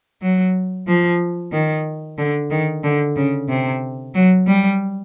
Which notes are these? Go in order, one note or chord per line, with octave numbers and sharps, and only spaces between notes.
F#3
F3
D#3
D3
D#3
D3
C#3
C3
F#3
G3